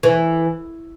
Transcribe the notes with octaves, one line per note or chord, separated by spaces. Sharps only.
E3